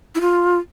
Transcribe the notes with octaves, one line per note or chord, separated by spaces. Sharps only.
E4
F4